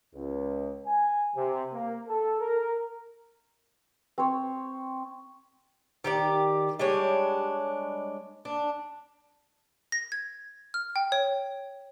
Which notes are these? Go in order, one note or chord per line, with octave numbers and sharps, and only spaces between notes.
C#2
G#5
C3
A#3
A4
A#4
C4 C#5
D#3 G4 D5
G3 G#3 D4 C#5
D4
A#6
G#6
F6
G5
C#5